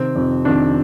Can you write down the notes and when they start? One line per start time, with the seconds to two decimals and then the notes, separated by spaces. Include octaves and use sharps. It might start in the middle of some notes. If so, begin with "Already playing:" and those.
Already playing: C3 D#3 C4
0.16 F2 C3 D#3
0.45 F2 C3 D#3 D4